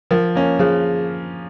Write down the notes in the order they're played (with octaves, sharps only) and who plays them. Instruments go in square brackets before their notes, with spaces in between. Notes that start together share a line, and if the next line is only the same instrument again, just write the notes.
[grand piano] F3 [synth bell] A#4
[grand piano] A#3 C#4
[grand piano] F3 [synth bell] G#4